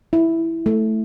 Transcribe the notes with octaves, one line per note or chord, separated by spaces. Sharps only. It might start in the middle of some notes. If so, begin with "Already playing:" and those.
E4
A3